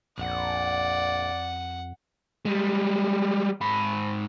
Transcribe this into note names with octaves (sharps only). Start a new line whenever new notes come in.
A#1 F2 D5 F#5
G3 G#3
G#2 B5